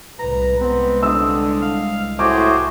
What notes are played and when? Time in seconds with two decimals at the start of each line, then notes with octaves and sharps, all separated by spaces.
0.19 C2 A2 B4 A#5
0.60 C2 G#3 B3 C4
1.03 D3 D#6 E6
1.62 F5 F6
2.19 A2 F#4 G#4 C5 D6